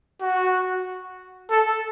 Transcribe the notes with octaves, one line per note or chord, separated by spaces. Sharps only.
F#4
A4